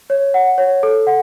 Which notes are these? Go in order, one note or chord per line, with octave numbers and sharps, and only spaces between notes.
C#5
F#5
C#5
A4
F#5